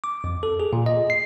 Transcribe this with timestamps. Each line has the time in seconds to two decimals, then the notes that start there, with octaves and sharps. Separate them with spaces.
0.04 D6
0.24 F2
0.43 A4
0.60 G#4
0.73 A#2
0.86 D#5
1.10 C7